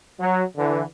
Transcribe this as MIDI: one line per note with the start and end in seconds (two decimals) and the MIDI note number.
0.20 0.43 54
0.57 0.83 50
0.57 0.83 52